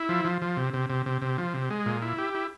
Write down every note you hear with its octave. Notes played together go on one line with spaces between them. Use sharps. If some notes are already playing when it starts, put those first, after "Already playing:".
Already playing: E4
F3
F3
F3
C3
C3
C3
C3
C3
F3
C3
G#3
A#2
E4
G4
E4